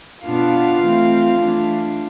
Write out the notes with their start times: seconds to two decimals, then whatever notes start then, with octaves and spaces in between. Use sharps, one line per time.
0.24 B2 B3 D4 F4 F5
0.80 E3 A3 C4
1.36 E3 A3 D4